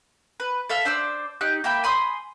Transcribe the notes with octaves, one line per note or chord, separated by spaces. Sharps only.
B4
A4 E5 F5
D4 C5 D5 E6
D#4 G4 F#6
A#3 E5 G5 B5
G#5 B5 C6 D#6